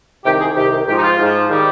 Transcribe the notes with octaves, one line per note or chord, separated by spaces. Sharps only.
C2 C3 D#3 G4
G#4
C2 C3 D#3 G4
G#2 F3 G4
D#4
F4
G#2 F3
D#3 G3